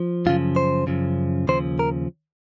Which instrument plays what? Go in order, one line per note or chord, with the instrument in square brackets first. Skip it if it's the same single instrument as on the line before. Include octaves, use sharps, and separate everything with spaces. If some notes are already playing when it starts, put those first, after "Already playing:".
Already playing: [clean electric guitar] F3
F#2 C#3 F3 F4
C5
F#2 C#3 F3
D#2 C#3 F3 C5
A#4